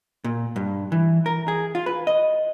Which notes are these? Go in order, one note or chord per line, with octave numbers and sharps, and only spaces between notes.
A#2
G2
E3
A#4
G#4
F4
B4
D#5